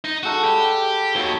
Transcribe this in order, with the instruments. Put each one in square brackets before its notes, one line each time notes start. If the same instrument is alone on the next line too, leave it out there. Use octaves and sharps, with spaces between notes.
[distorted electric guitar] D#4
[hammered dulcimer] G#3 A4 F#5 [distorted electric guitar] F#4
[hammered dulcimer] G3 [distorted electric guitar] G4
[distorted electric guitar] D#2 [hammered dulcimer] F#3